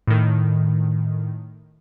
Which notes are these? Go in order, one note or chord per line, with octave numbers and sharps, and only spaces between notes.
A2 D#3